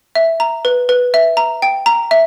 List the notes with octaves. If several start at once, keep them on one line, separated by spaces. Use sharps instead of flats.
E5
A#5
B4
B4
E5
A#5
G5
A#5
E5